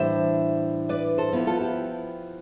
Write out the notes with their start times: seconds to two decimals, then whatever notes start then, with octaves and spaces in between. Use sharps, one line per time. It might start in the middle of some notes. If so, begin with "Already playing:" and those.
Already playing: A2 E3 G3 D4 C5 E5
0.89 B4 D5
1.18 A4 C5
1.32 F3 B3 E4
1.47 F4 A4
1.61 E4 G4